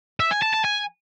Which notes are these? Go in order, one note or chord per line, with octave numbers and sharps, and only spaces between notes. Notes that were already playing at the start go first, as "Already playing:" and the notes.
E5
G#5
A5
A5
G#5